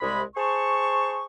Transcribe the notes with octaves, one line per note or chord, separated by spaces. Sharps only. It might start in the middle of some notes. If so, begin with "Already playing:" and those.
C2 G#3 B5
G#4 C5 A5 C#6